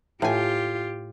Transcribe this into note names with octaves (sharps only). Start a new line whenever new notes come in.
A2 F4 G4 G#5